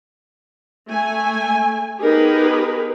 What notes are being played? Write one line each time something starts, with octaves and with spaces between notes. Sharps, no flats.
A3 G#5
B3 D#4 G4 G#4 A#4 B4